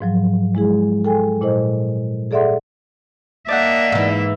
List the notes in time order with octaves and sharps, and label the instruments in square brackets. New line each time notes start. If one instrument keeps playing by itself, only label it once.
[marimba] G#2 F3 F#3
G#3 E4 G#4
A4 G5 G#5
A#2 E4 C5 D#5
G#4 A4 D5 E5 F#5 C6
[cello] A#3 E5 [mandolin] D4 D#4 F#5
[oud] G#2 E3